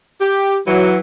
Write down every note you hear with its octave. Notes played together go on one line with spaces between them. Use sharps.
G4
E3 F#3